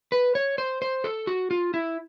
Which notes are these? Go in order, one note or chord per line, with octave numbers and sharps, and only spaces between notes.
B4
C#5
C5
C5
A4
F#4
F4
E4